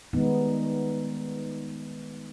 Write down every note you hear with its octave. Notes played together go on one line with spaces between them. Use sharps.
D#3 G3 G#3 B3 D#4